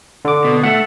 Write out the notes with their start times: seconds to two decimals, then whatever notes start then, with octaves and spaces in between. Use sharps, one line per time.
0.25 D3 D6
0.45 B2
0.63 A3 F#5